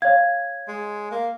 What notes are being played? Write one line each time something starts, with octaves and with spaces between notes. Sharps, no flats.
C#5 F5 G#6
G#3
A#3